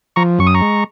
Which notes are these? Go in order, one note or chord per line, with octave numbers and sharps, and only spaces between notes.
F3 A#5 C#6
F#2 C#6
D#6
A#5 C#6
G#3